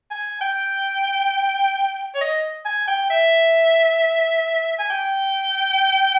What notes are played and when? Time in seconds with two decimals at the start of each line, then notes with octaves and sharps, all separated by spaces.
0.11 G#5
0.41 G5
2.14 C#5
2.21 D#5
2.65 G#5
2.88 G5
3.10 E5
4.79 G#5
4.90 G5